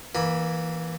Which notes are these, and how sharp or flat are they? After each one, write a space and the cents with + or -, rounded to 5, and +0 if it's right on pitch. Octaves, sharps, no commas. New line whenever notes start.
E3 +0 A#3 +20 B5 +0